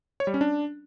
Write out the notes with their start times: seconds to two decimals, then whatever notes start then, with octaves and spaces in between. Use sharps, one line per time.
0.20 C#5
0.27 G3
0.34 C#4
0.41 D4